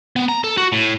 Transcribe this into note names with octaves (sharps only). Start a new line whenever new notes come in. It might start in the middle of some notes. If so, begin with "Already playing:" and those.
B3
A#5
A4
F#4
A2